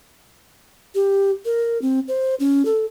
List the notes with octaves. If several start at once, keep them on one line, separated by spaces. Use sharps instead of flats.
G4
A#4
C4
C5
C#4
A4